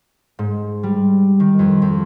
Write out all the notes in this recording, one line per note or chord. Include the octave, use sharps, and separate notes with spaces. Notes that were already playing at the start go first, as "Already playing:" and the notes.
G#2
G3
D#3
F2
F2